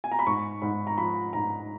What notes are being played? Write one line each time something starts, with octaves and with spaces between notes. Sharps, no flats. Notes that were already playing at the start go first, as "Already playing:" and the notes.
G#5
A#5
B5
G#2 C#6
G#2 B5
A#5
F3 B5
G#2 A#5